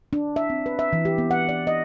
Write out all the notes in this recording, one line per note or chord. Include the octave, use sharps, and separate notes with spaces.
D4
E5
C4
B4
E5
E3
G4
B3
F#5
D5
D#5